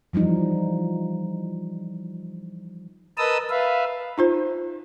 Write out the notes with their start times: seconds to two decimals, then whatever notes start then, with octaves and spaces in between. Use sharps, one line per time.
0.13 E3 F3 G3 D#4
3.18 A#4 B4 D#5 A5 D#6 E6
3.50 B4 E5 F5
4.18 D#4 F4 C5